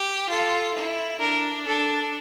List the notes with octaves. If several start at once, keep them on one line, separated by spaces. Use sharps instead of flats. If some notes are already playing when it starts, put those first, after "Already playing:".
Already playing: G4
F4 A4
E4
D4 A#4
D4 A4